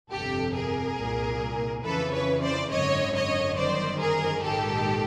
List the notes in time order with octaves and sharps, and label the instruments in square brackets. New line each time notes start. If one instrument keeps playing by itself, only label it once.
[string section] G1 F2 C3 G4 A4
G#4 A#4
C2 A#2
F2 C#3 E3 A4 B4
B4 C#5
C5 D5
G#1 F#2 D3 C#5 D#5
C#5 D#5
G1 F#2 D#3 C5 D5
G#4 A#4
A#1 G#2 D#3 G4 A4